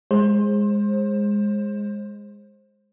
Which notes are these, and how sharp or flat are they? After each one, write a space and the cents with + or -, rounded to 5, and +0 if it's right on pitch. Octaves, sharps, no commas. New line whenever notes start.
G#3 -10 C5 +25